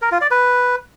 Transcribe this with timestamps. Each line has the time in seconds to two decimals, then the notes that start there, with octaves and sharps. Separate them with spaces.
0.02 A#4
0.11 F4
0.21 D5
0.31 B4